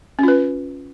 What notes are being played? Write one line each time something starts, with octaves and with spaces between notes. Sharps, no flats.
C#4 F4 B4